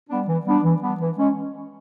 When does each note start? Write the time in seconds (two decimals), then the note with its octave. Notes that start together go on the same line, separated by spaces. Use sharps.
0.10 G3 B3 D4
0.28 E3
0.46 G3 B3 D4
0.64 E3
0.82 G3 B3 D4
1.00 E3
1.18 G#3 C#4